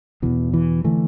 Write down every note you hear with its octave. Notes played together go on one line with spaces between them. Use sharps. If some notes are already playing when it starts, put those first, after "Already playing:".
E2 B2 E3
E3
D3 E3 A3